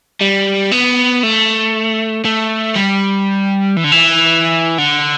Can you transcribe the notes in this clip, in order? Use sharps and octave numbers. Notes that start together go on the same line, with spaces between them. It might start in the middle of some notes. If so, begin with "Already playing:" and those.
G3
B3
A3
A3
G3
E3
D3
E3
D3